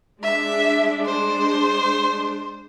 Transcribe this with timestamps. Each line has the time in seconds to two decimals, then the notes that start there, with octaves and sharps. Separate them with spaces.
0.23 G#3 D4 E5
1.05 C5